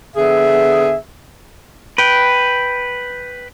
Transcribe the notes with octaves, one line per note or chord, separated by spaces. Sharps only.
D3 B3 G#4 E5
B4 G5